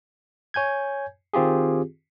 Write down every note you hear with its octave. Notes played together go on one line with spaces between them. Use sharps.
C#5 G#5 G6 G#6
D#3 C4 F4 G4 G#4